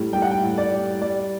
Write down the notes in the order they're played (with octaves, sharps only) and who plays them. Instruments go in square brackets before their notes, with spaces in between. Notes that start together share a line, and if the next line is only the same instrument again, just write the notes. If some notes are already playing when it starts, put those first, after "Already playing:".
Already playing: [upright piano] A2 G3
G3 G5
F#5
G5
A2
D5
G3
G3 D5